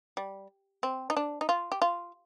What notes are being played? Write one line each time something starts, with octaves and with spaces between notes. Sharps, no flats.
G3
C4
D#4
D4
D#4
F4
G4
F4